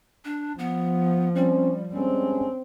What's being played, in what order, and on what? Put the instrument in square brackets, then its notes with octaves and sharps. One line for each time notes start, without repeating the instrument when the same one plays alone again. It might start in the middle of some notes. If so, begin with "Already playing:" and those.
[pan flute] D4
[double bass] F3 [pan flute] B3
[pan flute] G3 [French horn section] C4 C#4
[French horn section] G2 G#3 C#4 [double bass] C4